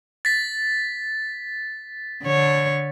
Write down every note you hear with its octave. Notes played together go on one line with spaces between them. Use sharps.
A6 B6
D3 C#5